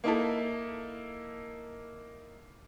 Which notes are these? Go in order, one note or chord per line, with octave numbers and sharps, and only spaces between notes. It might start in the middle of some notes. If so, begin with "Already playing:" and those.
A#3 D#4 E4 A4